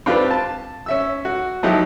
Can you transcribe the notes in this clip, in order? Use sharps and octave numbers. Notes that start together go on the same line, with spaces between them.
C4 D4 F4 G4 B4
A5
C#4 E5 E6
F#4
F3 F#3 D#4 E4 G4